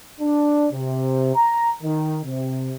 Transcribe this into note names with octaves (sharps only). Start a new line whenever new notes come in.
D4
C3
A#5
D#3
C3